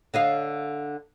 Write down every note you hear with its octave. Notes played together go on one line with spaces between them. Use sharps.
D3 D#5 F5